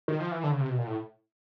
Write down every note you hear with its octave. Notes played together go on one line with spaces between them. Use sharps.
D#3
F3
E3
D3
C#3
C3
B2
A#2
A2